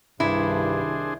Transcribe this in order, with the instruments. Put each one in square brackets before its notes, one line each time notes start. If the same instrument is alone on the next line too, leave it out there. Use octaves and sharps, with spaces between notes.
[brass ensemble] C2 D#3 [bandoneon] G2 [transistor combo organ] D4 G#4 C5 [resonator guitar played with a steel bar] E4